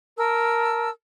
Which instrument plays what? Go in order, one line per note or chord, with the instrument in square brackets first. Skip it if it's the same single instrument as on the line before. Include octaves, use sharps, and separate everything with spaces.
[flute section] A#4 A5 E6